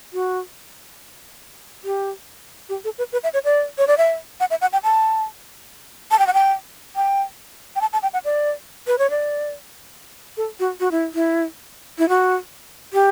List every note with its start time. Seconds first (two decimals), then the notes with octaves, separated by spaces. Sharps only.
0.13 F#4
1.84 G4
2.69 G4
2.85 A4
2.98 B4
3.13 B4
3.24 E5
3.34 C#5
3.44 D5
3.78 C#5
3.87 D5
3.98 E5
4.40 F#5
4.50 E5
4.61 F#5
4.73 G5
4.84 A5
6.11 A5
6.19 G5
6.27 F#5
6.34 G5
6.96 G5
7.76 G5
7.81 A5
7.93 A5
8.03 G5
8.13 F#5
8.25 D5
8.87 B4
8.99 C#5
9.10 D5
10.37 A4
10.60 F#4
10.80 F#4
10.91 E4
11.14 E4
11.98 E4
12.09 F#4
12.93 G4